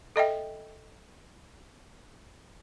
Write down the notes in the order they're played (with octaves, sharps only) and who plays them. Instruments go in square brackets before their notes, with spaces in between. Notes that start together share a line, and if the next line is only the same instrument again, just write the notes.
[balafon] A4 D#5 E5 G5